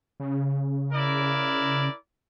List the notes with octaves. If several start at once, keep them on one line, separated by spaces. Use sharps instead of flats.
C#3
E4 A#4 D5